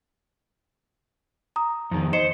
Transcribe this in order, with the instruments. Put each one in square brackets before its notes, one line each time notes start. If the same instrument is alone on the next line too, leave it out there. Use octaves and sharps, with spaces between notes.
[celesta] A#5 D#6
[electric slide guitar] F2 D#3
[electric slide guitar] C5 [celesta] D#5 C#7 E7